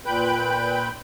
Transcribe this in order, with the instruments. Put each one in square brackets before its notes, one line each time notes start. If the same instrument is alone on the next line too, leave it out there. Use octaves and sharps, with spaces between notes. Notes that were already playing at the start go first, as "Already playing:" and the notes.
[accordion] A#2 B4 G5 B5 G6